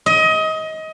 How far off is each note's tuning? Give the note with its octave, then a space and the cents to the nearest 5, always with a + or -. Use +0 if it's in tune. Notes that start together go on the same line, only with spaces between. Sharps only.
D#5 +25